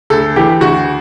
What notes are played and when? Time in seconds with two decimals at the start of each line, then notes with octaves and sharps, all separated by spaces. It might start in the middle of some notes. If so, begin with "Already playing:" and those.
0.10 D2 A4
0.36 E3 G4
0.61 D2 F#4